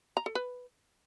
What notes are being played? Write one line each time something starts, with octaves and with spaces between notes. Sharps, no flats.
A#5
A4
B4